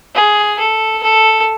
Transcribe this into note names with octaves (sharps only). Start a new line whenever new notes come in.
G#4
A4
A4